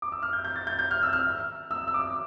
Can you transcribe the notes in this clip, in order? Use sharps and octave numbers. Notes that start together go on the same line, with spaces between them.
D6
E6
F6
G6
G6
A6
G6
G6
F6
E6
F6
E6
E6
D6